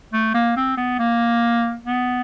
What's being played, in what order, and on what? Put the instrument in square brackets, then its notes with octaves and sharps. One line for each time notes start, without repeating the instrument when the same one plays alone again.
[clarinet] A3
A#3
C4
B3
A#3
B3